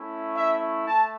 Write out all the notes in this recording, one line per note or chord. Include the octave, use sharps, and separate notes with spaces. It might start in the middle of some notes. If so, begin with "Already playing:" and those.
Already playing: A3 C#4 E4
E5
A3 A5